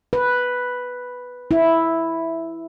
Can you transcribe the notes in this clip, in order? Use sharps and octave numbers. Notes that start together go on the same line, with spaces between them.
B4
E4